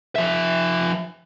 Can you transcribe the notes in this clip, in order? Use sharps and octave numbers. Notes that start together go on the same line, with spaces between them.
F3 E5